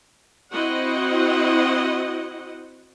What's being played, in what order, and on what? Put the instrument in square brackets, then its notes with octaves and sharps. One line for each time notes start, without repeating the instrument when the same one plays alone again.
[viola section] C4 E4 F#4 D#5 F#5